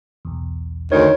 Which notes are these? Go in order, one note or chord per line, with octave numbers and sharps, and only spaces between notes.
B1 E2
D2 D#3 C#5